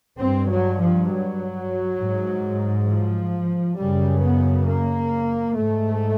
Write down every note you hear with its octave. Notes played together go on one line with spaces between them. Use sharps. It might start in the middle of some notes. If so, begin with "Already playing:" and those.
G2 C4
F#3
F3
F#3
G#2
F3
F#2 C#3 G3
B3
A#3
G#2 A3